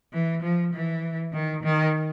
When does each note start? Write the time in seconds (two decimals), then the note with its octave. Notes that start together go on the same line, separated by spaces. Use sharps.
0.13 E3
0.43 F3
0.74 E3
1.33 D#3
1.64 D#3